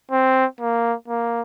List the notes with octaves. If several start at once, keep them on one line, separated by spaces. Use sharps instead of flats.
C4
A#3
A#3